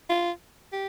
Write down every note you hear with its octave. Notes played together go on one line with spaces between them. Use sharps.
F4
G4